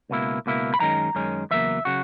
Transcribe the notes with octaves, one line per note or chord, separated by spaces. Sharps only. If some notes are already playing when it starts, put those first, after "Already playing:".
C#2 B2 A#3 E4
C#2 B2 A#3 E4
B5
F#2 D#3 G#3 C#4 A#5
F#2 D#3 G#3 C#4
E2 C#3 F#3 A#3 E5
C#3 F#3 F#4